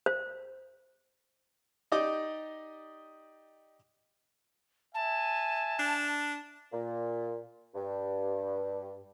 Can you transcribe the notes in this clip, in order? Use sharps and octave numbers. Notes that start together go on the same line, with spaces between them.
C5
D#4 G4 D5 D#5 D6
E5 G#5 A5
D4
A#2
G2